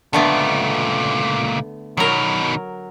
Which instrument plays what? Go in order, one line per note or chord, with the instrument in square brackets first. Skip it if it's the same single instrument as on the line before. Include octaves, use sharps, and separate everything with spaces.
[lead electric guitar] C#2 A#2 [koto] D3 A3 B3
[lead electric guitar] B2 D#3 [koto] F#3 A#4